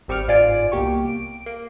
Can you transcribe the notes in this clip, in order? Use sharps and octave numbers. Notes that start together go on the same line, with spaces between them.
G#1 G3 C4 C#6 D6 F6
G1 G#2 F4 D5 G#5 D7
C2 B2 A#3 G4 C#6
D7
A#3